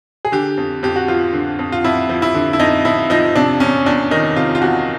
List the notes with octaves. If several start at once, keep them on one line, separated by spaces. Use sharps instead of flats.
G#4
D3 G4
F2
F2 G4
F#4
F3 F4
D3
F2
F4
F2 E4
F3
E4
D3
E4
F2 D#4
F2 E4
F3 D#4
C3 D4
E2 C#4
E2 D4
D#3 D#4
C3 F4
F4
E2 F#4